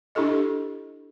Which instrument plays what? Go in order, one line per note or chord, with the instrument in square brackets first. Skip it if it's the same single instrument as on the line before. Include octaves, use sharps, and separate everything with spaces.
[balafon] D4 E4 G4 A4 D#5